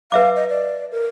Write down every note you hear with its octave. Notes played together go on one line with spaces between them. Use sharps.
B4 E5 F5 D6
D#5
D5
A#4